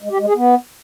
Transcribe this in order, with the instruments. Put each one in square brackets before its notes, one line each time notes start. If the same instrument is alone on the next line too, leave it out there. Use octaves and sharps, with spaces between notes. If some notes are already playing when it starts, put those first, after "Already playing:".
[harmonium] G#3
G4
G#3
G#4
B3